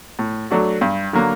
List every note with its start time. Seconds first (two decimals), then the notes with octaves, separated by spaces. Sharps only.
0.19 A2
0.50 F#3 A3 D4 F#4
0.81 G2
1.13 D3 F#3 A#3